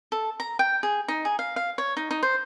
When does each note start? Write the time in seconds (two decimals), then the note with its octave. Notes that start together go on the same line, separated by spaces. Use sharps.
0.12 A4
0.40 A#5
0.59 G5
0.83 G#4
1.08 D#4
1.25 G#4
1.39 F5
1.56 F5
1.78 C#5
1.97 D#4
2.11 D#4
2.23 C5